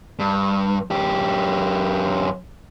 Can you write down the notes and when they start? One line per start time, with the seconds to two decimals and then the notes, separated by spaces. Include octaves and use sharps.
0.19 G2
0.91 F#2 G4